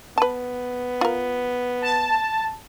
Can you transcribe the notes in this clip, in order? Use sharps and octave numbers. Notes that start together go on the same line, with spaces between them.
B3 B4 A5
F4 A#4
A5